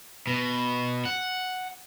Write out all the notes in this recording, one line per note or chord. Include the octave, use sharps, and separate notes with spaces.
B2
F#5